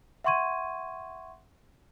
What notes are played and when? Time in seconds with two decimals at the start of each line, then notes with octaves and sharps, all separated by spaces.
0.24 E5 F#5 C6 C#6 G#6 D#7